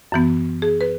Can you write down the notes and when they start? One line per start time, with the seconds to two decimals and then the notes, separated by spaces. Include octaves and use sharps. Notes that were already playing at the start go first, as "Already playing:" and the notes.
0.12 F#2 E3 B3
0.62 G#4
0.81 B4